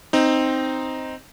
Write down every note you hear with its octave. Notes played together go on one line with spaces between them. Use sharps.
C4 D#4